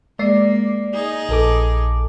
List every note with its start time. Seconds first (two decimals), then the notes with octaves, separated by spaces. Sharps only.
0.19 G#3 A#3 D5 C7
0.94 D#4 G#4
1.29 A#1 A4 D6